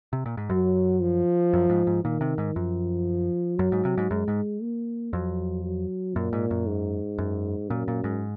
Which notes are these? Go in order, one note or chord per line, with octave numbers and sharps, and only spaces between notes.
C3
A#2
G#2
F#2 F#3
F3
F#2
G#2
G#2
A#2 D#3
C3
G#2
F#2 F3
F#2 F#3
G#2
C3
G#2
F#2 G#3
G#2
A#3
F2 F#3
F#3
F#2 A#2
G#2
F#2
G#2
F#2
F#2 A#2
A#2
G#2